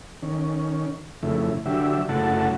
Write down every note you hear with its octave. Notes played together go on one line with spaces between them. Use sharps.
D#3 C#4
F2 C#3 A3 E4
D3 F#3 G4 E5
F#2 C#3 A3 E4 F#5 A5